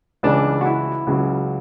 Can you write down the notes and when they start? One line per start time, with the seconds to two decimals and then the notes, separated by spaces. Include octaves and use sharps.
0.23 C#2 C#3 E3 D4
0.61 F#4
0.65 E4
1.07 C#2 C#3 F#3